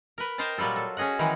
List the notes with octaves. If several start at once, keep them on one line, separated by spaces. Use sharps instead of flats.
A#4 B4
A#4 C5 D#5 G5 A5
A#2 F#3 G3 F4 A4
A4
C#4 F#4 G#4 D#5 F#5
D#3 E3 F#3 G#3 D#4